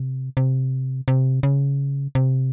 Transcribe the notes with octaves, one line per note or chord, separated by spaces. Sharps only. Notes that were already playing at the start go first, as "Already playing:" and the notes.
Already playing: C3
C3
C3
C#3
C3